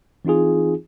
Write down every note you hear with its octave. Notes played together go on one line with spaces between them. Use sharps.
E3 C4 D#4 F4 G#4